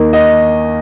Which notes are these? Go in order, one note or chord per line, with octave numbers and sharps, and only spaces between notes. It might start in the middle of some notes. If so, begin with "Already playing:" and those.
Already playing: D#2 D#3 A#3 D#4
D#5